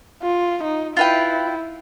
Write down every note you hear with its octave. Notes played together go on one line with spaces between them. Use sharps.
F4
D#4
E4 F4 B4 G5